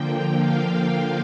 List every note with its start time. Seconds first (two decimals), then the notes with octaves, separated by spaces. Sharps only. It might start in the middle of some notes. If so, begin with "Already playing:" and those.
Already playing: D3 F3 A#3 G5
0.34 F5